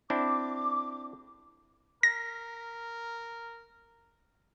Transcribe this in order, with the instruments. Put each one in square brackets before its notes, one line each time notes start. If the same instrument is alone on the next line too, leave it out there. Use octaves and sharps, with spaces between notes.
[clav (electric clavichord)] C4 D4 E4 [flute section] D6
[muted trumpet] A#4 [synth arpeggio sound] A#6